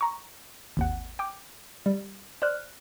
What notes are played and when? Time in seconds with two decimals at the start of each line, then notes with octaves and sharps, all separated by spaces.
0.01 A#5 C#6
0.77 G#1 D#2 F#5
1.19 G5 D6
1.86 G3
2.42 C5 D5 F6 F#6